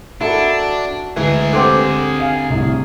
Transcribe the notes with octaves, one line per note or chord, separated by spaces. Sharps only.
D4 E4 F#4 A4 A#4
D2 E3 G#3 G#4 A#4
D3 C4 G4
F5 G#5
C2 A2